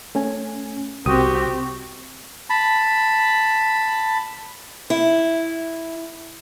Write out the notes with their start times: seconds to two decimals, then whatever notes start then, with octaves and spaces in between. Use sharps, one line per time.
0.15 A3 C#4 G#5
1.06 C2 C4 F#4 G4 D#6
2.50 A5 B5
4.90 E4